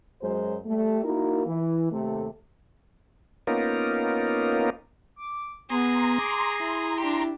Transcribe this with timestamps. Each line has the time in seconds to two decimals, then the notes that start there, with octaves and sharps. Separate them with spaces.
0.21 F#2 F#3 G#3 C5
0.66 G3 A3
1.03 A#3 D#4 E4 F#4 A#4
1.46 E3
1.91 D#2 C3 A3
3.47 A#3 B3 C#4 D#4 F4 A#4
5.16 D6
5.70 B3 G#4 A#5 C6
6.19 D6
6.60 E4
6.99 D4 G4